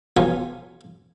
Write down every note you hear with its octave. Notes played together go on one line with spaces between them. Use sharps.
B1 E3 F3 F4 C#5 G#5